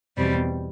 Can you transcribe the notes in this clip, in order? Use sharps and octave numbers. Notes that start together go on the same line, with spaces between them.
E2 B2 G3 C4